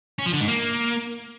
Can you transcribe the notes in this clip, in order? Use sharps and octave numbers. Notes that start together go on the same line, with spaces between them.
C#4
F3
D3
G#2
A#3